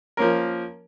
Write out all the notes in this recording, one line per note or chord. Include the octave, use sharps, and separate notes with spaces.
F3 A#3 C#4 A#4